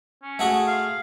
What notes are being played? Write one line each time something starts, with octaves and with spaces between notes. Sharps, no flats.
C#4
A3 F#4 G#4
F5